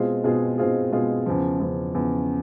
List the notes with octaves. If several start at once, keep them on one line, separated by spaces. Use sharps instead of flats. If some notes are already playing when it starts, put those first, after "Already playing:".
Already playing: B2 G#3 C4 F4 G#4
B2 G#3 C4 F4 G#4
B2 G#3 C4 F4 G#4
B2 G#3 C4 F4 G#4
E2 C#3 F3
E2 C#3 F3
E2 C#3 F3